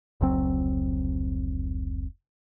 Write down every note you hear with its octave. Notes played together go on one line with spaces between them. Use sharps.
F1 C#2 F#3 C4